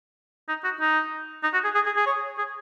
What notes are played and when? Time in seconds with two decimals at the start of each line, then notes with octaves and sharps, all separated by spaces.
0.48 D#4
0.64 F#4
0.80 D#4
1.43 D#4
1.54 F#4
1.64 G#4
1.75 G#4
1.86 G#4
1.97 G#4
2.07 C#5
2.38 G#4